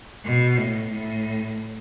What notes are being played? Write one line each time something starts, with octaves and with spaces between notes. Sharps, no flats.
B2
A2
A2